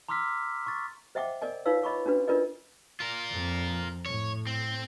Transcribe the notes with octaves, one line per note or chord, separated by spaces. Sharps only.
A#5 C6 D6 E6 F6 B6
C#6 A6
C5 D#5 E5 F#5 G5 D6
A#4 D5 D#5 G#5
D#4 F4 B4 C#5 F5 E6
C#5 D#5 B5 C#6 D6
C#4 D4 F#4 B4
D4 F4 A#4 B4 D5 D#5
F4 A#4
F2
A2 C#5
C4